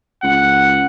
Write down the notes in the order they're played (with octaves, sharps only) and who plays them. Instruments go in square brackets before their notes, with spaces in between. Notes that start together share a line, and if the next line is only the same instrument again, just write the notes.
[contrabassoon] C#2 [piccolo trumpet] F#5